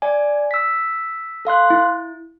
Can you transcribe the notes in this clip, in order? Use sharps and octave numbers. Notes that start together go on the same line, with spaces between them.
D5 G#5
E6 B6
A4 F5 C6 F#6
E4